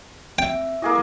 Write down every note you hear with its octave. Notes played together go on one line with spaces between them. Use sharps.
C4 E5 G5
A#3 E4 G#4 A4 D#5